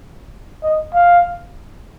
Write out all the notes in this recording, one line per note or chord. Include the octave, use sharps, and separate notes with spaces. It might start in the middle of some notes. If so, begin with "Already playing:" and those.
D#5
F5